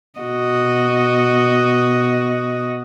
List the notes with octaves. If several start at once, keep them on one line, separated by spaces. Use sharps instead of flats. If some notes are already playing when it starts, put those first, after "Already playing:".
B2 F#4 D#5